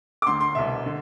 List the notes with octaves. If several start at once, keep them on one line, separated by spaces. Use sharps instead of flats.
D6
D2 D3 C6
C6
C2 B2 E5
D3